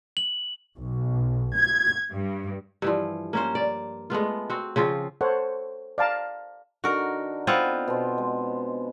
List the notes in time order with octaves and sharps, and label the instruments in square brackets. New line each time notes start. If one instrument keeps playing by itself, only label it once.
[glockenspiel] F#7
[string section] B1
G#6
G2
[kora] G2 E3 F3
A#3 C#4 C5
D5
G#3 A3 B3 F4
C4 F#4
C#3 F3 C4 F4
[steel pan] A4 C5 C#5 F#5
D5 F5 A5 A#5
[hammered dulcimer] D3 D4 D#4 [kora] F#4 A#4
[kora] B3 C4 F4
[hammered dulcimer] B2 C5
G#3